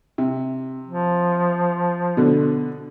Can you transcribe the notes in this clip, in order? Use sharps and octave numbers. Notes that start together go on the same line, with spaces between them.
C3
F3
B2 D3